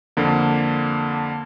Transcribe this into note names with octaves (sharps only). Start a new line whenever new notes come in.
F2 D3 A#3